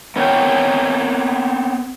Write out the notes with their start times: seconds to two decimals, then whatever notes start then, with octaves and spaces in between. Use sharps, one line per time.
0.16 B3 C4 A#4 C#5 G5